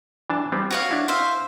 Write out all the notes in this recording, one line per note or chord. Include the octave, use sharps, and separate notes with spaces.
E3 D4 A5
G3 B3 C4
F#4 C#5 F5
D4 E4
C5 E5 F5